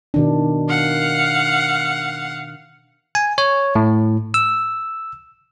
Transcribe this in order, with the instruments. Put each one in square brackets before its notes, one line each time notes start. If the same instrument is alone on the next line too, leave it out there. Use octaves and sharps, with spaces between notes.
[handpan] B2 D#3 D4
[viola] F5 F#5
[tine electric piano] G#5
C#5
A2
E6